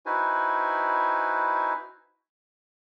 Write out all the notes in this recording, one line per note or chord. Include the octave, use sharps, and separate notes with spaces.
D#4 E4 F#4 B4 C5 G#5